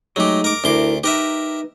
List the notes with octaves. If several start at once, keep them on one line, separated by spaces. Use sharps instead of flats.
F#3 G#3 A3 D#4 G4
A#4 D6
D2 D4 E4 A#4 C6 D6
D#4 G4 A#4 B4 E5